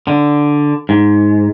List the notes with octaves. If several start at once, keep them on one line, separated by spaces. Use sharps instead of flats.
D3
G#2